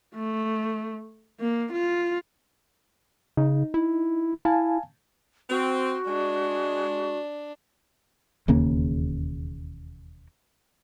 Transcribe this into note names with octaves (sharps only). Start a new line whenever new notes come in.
A3
A#3
F4
C#3 D#4
E4
E4 F5 G#5 A5
C4 F#4
G#3 D4
E1 D#2 C#3 A#3